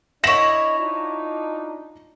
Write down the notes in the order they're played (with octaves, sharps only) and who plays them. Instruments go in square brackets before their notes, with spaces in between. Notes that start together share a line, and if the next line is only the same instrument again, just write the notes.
[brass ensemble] D4 D#5 [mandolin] E4 C#5 [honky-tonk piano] A#6 E7 F#7
[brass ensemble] D4 D#4 F4